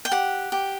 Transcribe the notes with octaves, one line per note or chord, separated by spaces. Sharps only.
G5
G4 F#5
G4